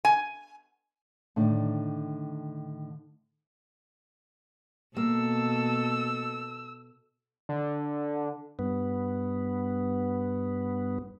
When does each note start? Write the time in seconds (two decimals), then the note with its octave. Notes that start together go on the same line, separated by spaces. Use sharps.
0.05 G#5
1.36 A2 D3 D#3 D4
4.97 B2 A#3 A4 E6
7.49 D3
8.59 G2 B3